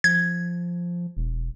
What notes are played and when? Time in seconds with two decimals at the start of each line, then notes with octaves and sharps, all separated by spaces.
0.04 F3 G#6
1.17 E1